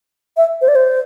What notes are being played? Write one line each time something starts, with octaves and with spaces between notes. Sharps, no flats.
E5
C5
D5
C5